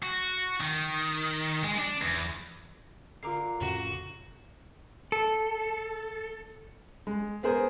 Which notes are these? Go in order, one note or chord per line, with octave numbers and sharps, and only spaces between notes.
F#4
D#3
G#3
D4
E2
D3 F4 A#4 D6 C7
F2 A2 C#3 F#4
A4
G#3
B3 G#4 A#4 C5